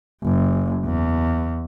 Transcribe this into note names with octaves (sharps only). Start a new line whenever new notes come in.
F#1
E2